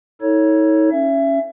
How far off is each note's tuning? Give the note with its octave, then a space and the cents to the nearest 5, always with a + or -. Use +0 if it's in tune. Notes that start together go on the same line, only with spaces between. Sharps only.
D#4 +40 A4 +15 C#5 +0
C#4 -5 E5 +25